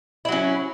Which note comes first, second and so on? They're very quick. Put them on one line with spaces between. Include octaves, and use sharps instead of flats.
E4 F#3 C#4